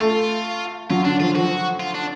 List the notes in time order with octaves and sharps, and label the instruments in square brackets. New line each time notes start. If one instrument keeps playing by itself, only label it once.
[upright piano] A3 [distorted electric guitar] F4
[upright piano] F#3 [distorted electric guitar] F4
[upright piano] D3 [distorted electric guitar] D4
[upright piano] F3 [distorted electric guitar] F4
[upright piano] F3 [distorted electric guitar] F#4
[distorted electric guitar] F4
D4